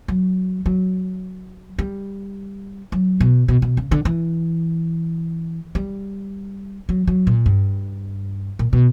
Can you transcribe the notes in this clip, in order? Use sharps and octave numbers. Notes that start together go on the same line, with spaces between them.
F#3
F#3
G3
F#3
B2
B2
B2
C#3
D3
E3
G3
F#3
F#3
A#2
G2
A#2
B2